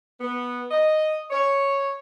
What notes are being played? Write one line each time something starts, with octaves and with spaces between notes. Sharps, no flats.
B3
D#5
C#5